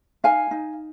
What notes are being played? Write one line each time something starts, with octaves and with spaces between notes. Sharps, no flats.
D#4 F5 G#5
D#4